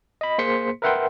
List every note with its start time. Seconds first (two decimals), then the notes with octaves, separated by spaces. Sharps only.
0.21 D#5 B5
0.38 A#3 G#4 C5 C6 B6 C#7
0.82 A#4 B4 E5 F#5 G5 C6